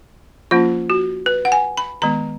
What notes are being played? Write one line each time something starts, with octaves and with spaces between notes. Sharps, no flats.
F3 A#3 C#4 F4
F#4
B4
F#5
G#5
B5
D#3 G#3 B3 A#5